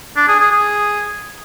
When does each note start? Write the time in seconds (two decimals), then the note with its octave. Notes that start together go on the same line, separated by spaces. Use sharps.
0.16 D4
0.28 G#4
0.39 G#4
0.51 G#4